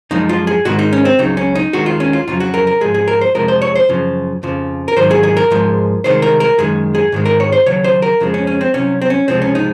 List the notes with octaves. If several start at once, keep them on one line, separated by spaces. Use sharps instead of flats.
F#2 F3 G#3 D#4
F4
G#4
G#2 D#3 G#3 F#4
D#4
C#4
C4
C#2 C#3 F#3 D#4
C#4
D#4
D#2 D#3 G#3 F#4
F4
C#4
F4
F2 C#3 F#3 F4
F#4
A#4
A#4
G#2 F3 G#3 G#4
G#4
A#4
C5
F2 C3 F3 G#3 A#4
C5
C#5
C5
F#2 C#3 F3
F2 C#3 F3
A#4
G#2 D#3 F#3 C5
G#4
G#4
A#4
G#2 F3 G#3
C2 C3 D#3 G#3 C5
A#4
A#4
F#2 D#3 G#3 G#4
G#4
G#2 D#3 G#3
A#4
C#5
C5
D#2 C#3 F#3 C#5
C5
A#4
F2 C#3 F3 G#3
C#4
C#4
C4
C2 C3 F#3 C#4
C4
C#4
C#2 C3 F3 G#3 C4
C#4
D#4